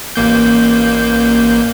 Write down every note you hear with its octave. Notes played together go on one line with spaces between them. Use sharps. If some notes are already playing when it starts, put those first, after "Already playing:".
A1 A#3 G6